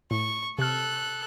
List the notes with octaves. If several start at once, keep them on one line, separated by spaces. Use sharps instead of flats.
A2 C#6
C3 A4 F6 F#6